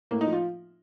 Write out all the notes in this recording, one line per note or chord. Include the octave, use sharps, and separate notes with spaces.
A2 A#3
D#4
F3
F4